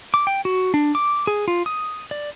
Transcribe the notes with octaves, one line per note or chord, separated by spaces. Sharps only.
D6
G5
F#4
D4
D6
G#4
F4
D#6
D5